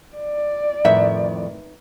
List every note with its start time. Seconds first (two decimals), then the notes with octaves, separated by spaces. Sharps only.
0.16 D5
0.84 F2 A2 D#3 D#4 B4 E5